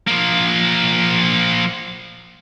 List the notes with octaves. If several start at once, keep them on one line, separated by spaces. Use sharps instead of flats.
F3 A#3